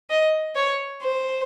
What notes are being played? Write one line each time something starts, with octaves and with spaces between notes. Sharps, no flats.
D#5
C#5
C5